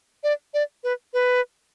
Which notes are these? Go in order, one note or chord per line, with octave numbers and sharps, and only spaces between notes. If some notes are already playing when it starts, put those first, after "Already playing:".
D5
D5
B4
B4